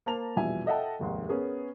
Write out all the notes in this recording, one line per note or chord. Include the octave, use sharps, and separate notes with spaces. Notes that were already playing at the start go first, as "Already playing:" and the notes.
A#3 C5 A5 A#5 F7
A#1 E2 G2 B2 E5 G#5
A4 D#5 E5 F#5 G5 A5
F1 D#2 G#2 C6
B3 C#4 G#4 A#4